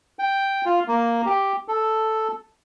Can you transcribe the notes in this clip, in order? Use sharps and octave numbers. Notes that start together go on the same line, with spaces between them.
G5
F4
A#3
G4
A4